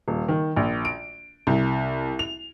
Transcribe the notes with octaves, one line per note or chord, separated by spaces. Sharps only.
D#1
D#3
A#1
D7
C2
F7